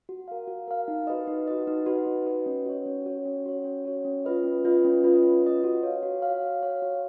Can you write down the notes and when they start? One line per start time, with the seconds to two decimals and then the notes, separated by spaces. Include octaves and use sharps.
0.09 F#4
0.28 A#4 F5
0.47 F#4
0.68 A#4 F5
0.88 D#4
1.07 F#4 B4 D#5
1.27 D#4
1.47 F#4 B4 D#5
1.67 D#4
1.86 F#4 B4 D#5
2.07 D#4
2.26 F#4 B4 D#5
2.46 C#4
2.66 F#4 C#5
2.86 C#4
3.06 F#4 C#5
3.25 C#4
3.46 F#4 C#5
3.64 C#4
3.85 F#4 C#5
4.05 C#4
4.25 F4 B4 D#5
4.44 C#4
4.65 F4 B4 D#5
4.85 C#4
5.04 F4 B4 D#5
5.23 C#4
5.43 F4 B4 D#5
5.64 F#4
5.83 C#5 F5
6.03 F#4
6.22 C#5 F5
6.42 F#4
6.63 C#5 F5
6.82 F#4